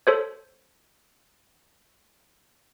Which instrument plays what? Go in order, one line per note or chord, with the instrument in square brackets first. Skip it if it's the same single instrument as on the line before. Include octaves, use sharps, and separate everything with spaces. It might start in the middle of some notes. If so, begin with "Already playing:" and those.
[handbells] A4 C5 C#5